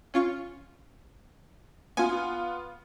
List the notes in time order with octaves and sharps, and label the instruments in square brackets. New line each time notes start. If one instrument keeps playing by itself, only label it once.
[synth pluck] C#4 F4 C#6
[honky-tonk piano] B3 F4 [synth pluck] G#5